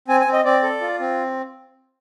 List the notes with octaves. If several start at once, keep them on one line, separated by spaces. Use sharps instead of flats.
C4 G#5
G#5
C4
D#5
C4 D5
A4
F4
C4